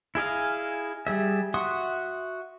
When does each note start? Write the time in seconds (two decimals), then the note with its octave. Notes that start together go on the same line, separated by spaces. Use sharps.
0.15 E4 G#4 D#5 F5
1.07 G3 G#4 E5
1.54 F#4 E5 F#5 C6 D#6